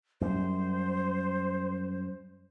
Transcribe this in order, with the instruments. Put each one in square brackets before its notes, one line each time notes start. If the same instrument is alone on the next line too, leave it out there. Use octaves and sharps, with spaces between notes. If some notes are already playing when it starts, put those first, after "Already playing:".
[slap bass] F#2 G3 [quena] C5